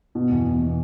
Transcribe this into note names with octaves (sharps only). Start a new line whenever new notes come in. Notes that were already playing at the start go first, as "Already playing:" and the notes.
B2
E2
B2
B2